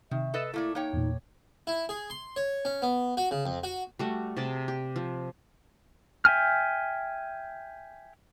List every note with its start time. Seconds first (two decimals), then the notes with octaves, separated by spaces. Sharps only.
0.11 C3 D#3 E5
0.34 A4 B4 D#5 E6 A6 E7
0.54 A3 A#3 E4 D5
0.75 A#3 D#4 C#5 G5
0.93 E2 A#2
1.67 E4
1.89 G#4
2.10 C6
2.36 C#5
2.65 C#4
2.82 B3
3.17 F#4
3.31 C#3
3.46 F2
3.63 F#4
3.99 G3 A3 F#4
4.37 C3 G#4 D5 A5
4.68 G4
4.96 F3
6.25 E5 G5 G#5 F6